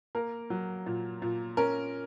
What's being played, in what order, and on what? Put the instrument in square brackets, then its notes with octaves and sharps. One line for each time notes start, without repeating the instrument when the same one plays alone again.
[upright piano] A#3 A#4
F#3
A#2
A#2
C#4 A#4